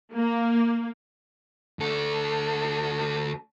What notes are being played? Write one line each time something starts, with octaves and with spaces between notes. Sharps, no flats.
A#3
D2 A4